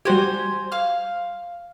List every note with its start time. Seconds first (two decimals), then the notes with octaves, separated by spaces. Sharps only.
0.05 G3 F#4 G4 C5 G#5
0.72 F5 F6